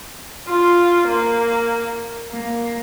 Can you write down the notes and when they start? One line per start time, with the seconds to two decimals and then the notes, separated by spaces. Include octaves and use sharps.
0.48 F4
1.07 A#3
2.31 A#3